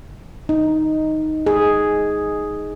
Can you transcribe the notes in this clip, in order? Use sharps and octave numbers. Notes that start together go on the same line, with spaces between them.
D#4
G#4